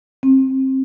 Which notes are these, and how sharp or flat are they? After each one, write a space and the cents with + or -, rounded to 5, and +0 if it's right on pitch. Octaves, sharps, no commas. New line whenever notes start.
C4 +25